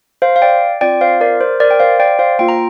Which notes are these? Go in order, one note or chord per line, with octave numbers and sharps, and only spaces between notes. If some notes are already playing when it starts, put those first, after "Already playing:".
C5 F5
F5
D5 G5
C4 F4 D5 G5
C5 F5
A#4 D5
C5
A#4 D5
G5
C5 F5
D5 G5
C5 F5
A#3 F4 G5
A#5